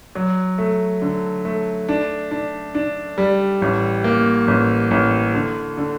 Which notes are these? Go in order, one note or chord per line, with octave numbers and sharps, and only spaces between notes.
F#3
A3
D3
A3
D4
D4
D4
G3
A1
A#3
A1
A1
D3
D3